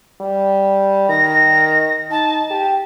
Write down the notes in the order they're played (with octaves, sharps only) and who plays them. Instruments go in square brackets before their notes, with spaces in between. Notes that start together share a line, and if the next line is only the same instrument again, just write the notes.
[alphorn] G3
[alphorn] D#3 [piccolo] A#6
[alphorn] D#4 [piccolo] A5
[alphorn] G4